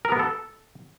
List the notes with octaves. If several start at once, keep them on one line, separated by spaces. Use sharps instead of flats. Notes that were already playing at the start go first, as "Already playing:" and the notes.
A#4
B3
A4